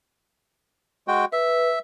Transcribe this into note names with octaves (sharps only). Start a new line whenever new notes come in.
G#3 F#4 G5
B4 E5